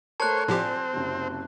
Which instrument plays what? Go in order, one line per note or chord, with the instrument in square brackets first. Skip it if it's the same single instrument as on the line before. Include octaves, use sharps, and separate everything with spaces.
[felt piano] A3 A#4 [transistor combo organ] C5 C#5 [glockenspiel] A5 F#6
[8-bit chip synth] A2 F3 G4 [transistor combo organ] C4 [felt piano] F4 D5 G#5
[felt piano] F#1 C3